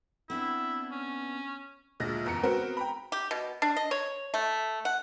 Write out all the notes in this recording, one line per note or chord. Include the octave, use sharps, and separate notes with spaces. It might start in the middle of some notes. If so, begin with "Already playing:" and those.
B3 C4 D4 E4
C#4
D2 A#2 G#3 A#6
F#1 E2 A#5 C#7
B3 C4 F#4 A#4 B4
G5 A#5 B5
G4
B2
D4
D#5
C#5
A3
F#5